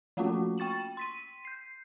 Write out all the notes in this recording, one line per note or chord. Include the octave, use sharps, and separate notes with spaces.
F3 A3 A#3 C#4 F4 F#4
G5 C#6 A6 E7 F#7
C6 B6 D#7
G6 C7